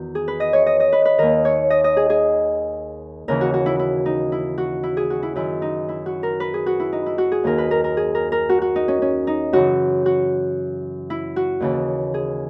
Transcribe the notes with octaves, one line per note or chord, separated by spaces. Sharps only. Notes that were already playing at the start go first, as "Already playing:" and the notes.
Already playing: E2 D#3 F#4
G#4
B4
D#5
C#5
D#5
D#5
B4
B4
D#2 D#3 A#4
C#5
D#5
D#5
G#4
G#4
D#2 C#3 E3 A#4
F#4
F#4
E4
E4
D#4
E4
F#4
E4
G#4
F#4
E4
F#2 D#3 E4
D#4
E4
F#4
A#4
B4
G#4
F#4
E4
D#4
E4
F#4
G#4
D#2 D#3 A#4
B4
A#4
A#4
G#4
A#4
A#4
F#4
F#4
D#4
C#4
C#4
D#4
F#2 C#3 E3 F#4
F#4
E4
F#4
D#2 C#3 E3
G#4